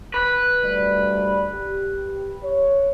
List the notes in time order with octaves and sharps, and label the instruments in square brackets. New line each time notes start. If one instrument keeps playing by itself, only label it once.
[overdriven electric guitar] B4
[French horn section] D2 G3 D5
G4
C#5